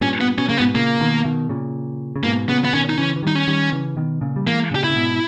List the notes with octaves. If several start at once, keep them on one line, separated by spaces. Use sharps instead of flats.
G2 A#2 C#4
B3
B2 C#4
C#3 A#3
B3
G#2 B2
A#2 C#3 A#3
B2 D#3
B2 D#3
A#2 C#3
C#3
G#2 B2 A#3
A#2 C#3 B3
B3
B2 D#3 C#4
D#4
C#3 E3 C#4
E3
D#3 G3 D#4
C#4
D#3 G3
C#3 E3
B2 D#3
A#2 C#3
G3
E3 G#3 A#3
A#2 C#3 G4
E4
C#3
G#2 B2